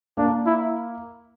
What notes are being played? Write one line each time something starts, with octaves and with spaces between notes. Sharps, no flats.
A#3 D4
E4